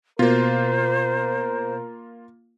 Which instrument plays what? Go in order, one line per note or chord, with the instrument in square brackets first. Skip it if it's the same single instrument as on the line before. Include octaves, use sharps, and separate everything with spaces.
[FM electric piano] B2 [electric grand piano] A#3 F4 [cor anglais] A#4 [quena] C5